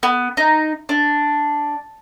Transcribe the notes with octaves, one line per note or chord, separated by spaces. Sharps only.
B3
D#4
D4